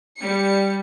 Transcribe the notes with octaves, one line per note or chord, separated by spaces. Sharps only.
G3 C#7